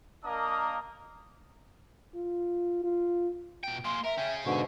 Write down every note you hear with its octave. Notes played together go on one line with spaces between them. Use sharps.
A#3 D4 A#4 D#5 A#5 D#6
F4
F4
B2 G5
A#3 G#4 C6
A#4 E5
C#4 G#4 G5
G#2 B2 D3 C#6